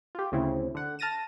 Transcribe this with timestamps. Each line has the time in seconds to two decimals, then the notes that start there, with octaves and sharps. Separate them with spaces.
0.15 F4 G4
0.32 D2 C#3 C4 E4
0.74 D3 F#5
0.99 A5 F6 A6 A#6 D#7 E7